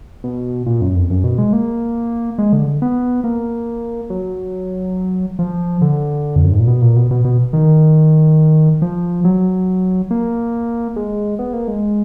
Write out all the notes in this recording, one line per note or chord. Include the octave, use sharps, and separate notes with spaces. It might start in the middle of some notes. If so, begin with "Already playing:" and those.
B2
A#2
F#2
F2
F#2
B2
G#3
A#3
G#3
D3
B3
A#3
F#3
F3
D3
F2
F#2
G#2
A#2
B2
A#2
B2
B2
B2
D#3
F3
F#3
A#3
G#3
B3
A#3
G#3